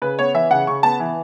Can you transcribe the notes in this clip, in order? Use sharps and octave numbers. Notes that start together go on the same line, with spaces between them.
C#3 B4
B3 C#5
E3 E5
C#3 F#5
C#3 C#6
B3 A5
E3